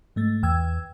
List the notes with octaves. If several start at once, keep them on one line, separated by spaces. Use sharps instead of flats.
G#2 A3 A6
E2 G5 E6 G#6